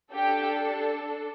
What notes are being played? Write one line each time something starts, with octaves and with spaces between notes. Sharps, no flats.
D4 G4 A4 G5